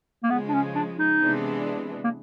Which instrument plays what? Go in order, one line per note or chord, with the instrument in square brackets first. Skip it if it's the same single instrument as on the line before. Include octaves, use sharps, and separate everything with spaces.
[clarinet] A#3
[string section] C#3 F3 G#3 [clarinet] B3
[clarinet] D4
C#4
D4
D#4
[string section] C3 E3 G#3 B3 D4
[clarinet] A#3